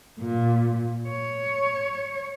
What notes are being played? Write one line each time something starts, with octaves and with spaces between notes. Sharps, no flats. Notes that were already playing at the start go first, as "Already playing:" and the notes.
A#2
C#5